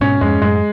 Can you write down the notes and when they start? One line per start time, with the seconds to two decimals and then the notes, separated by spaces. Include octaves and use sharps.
0.01 G#2 B2 C#4
0.21 F2 G#2 G#3
0.41 F#2 A2 G#3